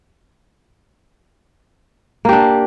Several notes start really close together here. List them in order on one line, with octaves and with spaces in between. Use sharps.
A#3 G4 D4